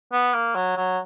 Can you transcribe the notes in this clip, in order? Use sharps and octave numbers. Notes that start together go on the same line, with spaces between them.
B3
A#3
F#3
F#3